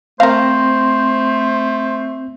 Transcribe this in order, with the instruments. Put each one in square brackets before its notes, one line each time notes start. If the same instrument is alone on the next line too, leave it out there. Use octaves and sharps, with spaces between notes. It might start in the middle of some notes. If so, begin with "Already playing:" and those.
[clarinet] A3 [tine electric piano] C4 A#6 [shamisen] A#4 F5 [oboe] C5